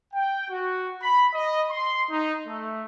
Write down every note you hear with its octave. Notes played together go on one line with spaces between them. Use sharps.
G5
F#4
B5
D#5
C6
D#4
A3